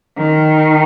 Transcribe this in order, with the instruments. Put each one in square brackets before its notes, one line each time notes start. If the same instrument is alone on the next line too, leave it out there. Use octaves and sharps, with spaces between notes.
[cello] D#3